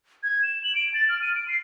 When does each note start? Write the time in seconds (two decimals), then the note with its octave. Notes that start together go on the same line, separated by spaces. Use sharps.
0.23 G#6
0.43 E7
0.63 F#7
0.75 D7
0.94 A6
1.09 F6
1.22 D#7
1.36 D7
1.48 C7